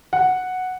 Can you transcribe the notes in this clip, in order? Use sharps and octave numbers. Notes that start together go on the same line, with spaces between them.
F#5